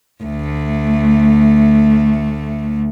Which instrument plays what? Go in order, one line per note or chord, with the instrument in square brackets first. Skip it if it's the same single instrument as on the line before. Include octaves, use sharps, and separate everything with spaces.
[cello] D2 A3